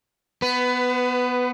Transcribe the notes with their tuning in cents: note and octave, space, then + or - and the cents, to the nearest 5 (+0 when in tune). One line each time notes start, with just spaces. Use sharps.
B3 +5 B4 +20